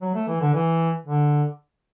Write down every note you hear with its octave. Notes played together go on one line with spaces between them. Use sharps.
F#3
A3
E3
D3
E3
D3